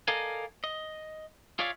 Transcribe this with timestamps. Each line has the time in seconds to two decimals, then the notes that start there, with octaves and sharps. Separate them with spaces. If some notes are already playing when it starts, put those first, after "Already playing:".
0.08 A4 A#4 D5 D#5 F5 G#5
0.64 D#5
1.59 F4 G#4 C#5 D5 E5 F5